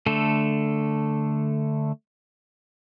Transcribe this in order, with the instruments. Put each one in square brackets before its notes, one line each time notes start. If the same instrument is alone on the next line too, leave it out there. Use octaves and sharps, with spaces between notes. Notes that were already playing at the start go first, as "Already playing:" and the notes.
[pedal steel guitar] D3 A3 A4